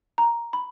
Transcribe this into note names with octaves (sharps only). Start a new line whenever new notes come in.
A#5
B5